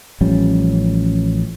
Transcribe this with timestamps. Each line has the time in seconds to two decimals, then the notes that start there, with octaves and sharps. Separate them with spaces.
0.21 A1 F3 G3 C#4